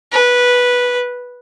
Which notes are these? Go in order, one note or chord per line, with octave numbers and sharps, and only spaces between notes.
B4